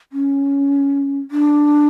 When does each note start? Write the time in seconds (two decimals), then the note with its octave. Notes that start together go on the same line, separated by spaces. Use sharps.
0.12 C#4
1.31 D4